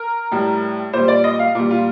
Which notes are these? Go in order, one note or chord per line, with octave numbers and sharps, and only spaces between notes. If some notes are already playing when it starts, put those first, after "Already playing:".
Already playing: A#4
A2 G3
A#2 G3 C5
D5
D#5
F5
A#2 G3
F4